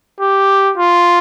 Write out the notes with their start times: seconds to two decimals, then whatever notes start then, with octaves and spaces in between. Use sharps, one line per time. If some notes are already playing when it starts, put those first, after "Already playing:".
0.20 G4
0.78 F4